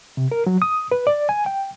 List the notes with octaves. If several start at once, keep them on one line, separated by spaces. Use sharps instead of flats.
C3
A#4
F#3
D#6
B4
D5
G#5
G5